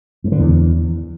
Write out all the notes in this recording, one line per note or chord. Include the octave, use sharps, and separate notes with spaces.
G2
D3
E2